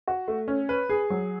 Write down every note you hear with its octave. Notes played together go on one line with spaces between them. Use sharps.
F#4
A3
C#4
B4
G#4
F#3